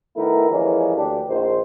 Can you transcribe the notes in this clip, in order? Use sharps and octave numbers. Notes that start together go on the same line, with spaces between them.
D#3 A3 B3 E4 A#4
E3 F3 G3 G#3 A#3 C#4
D2 D4 G4
A#1 D#3 C5